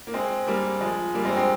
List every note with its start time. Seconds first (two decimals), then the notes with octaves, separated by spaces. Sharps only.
0.07 A#3
0.14 G#3 C4
0.47 G3 A#3
0.80 F3 G#3
1.14 G3 A#3
1.25 G#3 C4
1.36 G#3 C4